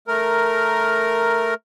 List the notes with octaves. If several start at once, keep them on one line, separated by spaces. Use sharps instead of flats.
A3 A#4